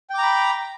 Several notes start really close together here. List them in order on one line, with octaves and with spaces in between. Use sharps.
G5 D6 A#5 B5